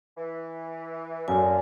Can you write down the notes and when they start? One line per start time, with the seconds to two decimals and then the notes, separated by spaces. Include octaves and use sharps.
0.18 E3
1.28 F#2 D3 A#3 G#5